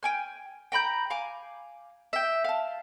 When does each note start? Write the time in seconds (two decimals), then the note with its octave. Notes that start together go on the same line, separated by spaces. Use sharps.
0.03 G5 G#5 F6
0.72 G5 A#5 B5 G6
1.10 F5 G#5 D6
2.13 E5 G5
2.44 F5 A5